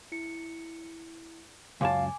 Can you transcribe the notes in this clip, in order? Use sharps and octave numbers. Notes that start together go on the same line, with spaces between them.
E4 C#7
C#2 F#2 F5 G#5 A5 D6